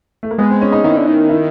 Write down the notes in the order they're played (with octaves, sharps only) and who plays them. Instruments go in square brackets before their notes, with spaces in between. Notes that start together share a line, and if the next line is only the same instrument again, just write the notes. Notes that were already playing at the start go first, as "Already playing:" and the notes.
[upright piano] A3
A#3
[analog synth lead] G#3 [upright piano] B3
[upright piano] C4
C#4
D#4
[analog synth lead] D#3 [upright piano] E4
[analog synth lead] D3
D#3
[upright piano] E4